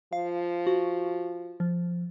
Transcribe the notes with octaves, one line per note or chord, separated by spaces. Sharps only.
F3 F5
F#4
F3